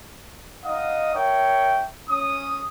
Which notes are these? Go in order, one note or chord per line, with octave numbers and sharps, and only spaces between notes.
D#4 D#5 F5 F#5 D#6
A#4 C#5 E5 G5
C#4 D#6